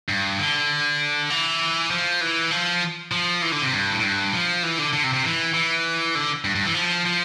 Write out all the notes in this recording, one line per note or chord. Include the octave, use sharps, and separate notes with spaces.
G2
D3
E3
F3
E3
F3
F3
E3
D3
C3
G2
A2
G2
F3
E3
D3
D3
C3
C3
E3
E3
D3
G2
G2
E3
F3
F3